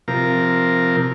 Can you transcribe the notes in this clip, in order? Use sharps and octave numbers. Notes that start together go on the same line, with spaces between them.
C3 F3 A#4